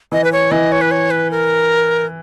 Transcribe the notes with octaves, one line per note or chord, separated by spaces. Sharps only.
E3 D#5
B4
C#5
E3 D#5
C#5
B4
C#5
B4
A#4